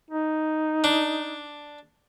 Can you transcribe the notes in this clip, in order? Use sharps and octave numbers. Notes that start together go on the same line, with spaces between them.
D#4
D4